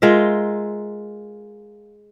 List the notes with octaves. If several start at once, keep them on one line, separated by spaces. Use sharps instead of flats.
G#3 F4 A#4 E5